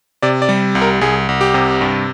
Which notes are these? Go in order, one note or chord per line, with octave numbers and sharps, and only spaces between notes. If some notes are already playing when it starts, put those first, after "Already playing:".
C3 D5
D5
G3
C2
A#4
C2 G#4
C2
G4
C3
G2